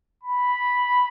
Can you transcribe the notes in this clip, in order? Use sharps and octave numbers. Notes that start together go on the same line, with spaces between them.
B5